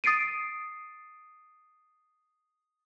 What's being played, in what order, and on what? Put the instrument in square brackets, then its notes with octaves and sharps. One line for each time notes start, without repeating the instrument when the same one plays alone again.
[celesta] D#6 A6 C7 D7 D#7